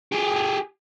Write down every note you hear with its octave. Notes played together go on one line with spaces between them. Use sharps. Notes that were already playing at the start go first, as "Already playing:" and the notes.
G4 G#4